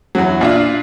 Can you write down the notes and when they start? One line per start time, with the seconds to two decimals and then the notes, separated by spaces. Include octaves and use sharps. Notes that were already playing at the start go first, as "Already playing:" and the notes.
0.15 E2 F#3
0.41 A#2 D4 F4